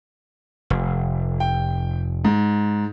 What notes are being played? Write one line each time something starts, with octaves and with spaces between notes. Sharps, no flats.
F1
G5
G#2